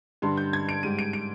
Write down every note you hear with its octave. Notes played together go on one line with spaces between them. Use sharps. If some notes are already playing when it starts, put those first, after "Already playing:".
G2 D3 G3 C6
G6
G#6
D7
G#2 G3 D#7
D7
D7